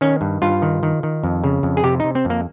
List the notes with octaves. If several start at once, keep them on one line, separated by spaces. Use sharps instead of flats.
D#3 C#4
G2
G2 F4
D#3
D#3
D#3
F2
C#3
F2
G#4
C3 G4
C3 D#4
C4
F2
A#3